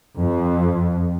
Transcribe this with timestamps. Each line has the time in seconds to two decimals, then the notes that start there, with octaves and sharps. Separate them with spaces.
0.17 F2